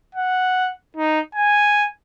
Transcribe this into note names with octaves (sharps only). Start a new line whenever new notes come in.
F#5
D#4
G#5